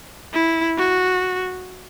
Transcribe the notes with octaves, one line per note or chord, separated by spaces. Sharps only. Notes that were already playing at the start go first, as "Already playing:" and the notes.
E4
F#4